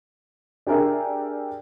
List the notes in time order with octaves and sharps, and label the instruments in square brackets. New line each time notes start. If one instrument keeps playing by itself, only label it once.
[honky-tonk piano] D4 G4 G#4 A#4 D5 E5